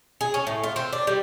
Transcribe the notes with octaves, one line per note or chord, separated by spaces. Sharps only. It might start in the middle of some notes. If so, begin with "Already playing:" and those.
G#4
C#4
A2
F4
C4
D4
G3